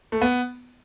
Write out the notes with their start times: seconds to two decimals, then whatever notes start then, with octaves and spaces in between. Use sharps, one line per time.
0.12 A3
0.21 B3